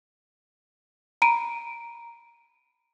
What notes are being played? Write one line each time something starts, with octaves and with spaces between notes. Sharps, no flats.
A#5 B5 D7 D#7